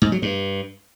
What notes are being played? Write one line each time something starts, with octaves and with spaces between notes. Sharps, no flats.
G#2
F#3
G2